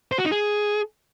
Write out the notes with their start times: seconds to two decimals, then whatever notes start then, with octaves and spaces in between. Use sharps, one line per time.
0.12 C5
0.18 F#4
0.25 D#4
0.32 G#4